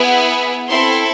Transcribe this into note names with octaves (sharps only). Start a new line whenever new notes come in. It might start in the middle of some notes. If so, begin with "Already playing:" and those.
Already playing: B3 E4 G#4
C4 E4 A4 C6